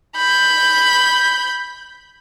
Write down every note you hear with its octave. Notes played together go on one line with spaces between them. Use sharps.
B5 G6